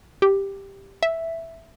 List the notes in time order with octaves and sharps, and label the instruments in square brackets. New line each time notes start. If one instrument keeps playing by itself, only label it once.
[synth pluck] G4
E5